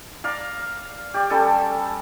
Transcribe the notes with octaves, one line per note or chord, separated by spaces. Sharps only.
D5 F5 A#5
G4 D5
G3 C#4 A4 A5